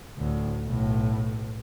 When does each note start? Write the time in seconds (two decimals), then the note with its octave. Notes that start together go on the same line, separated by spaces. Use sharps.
0.17 D2 A2
0.67 B1 A2